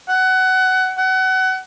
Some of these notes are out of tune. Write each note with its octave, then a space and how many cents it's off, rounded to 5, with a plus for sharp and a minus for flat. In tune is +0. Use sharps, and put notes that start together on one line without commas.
F#5 +20
F#5 +25